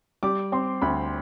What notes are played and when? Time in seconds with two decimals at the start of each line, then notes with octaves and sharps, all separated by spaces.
0.23 G3 D6
0.52 C4 C6
0.82 D2 B5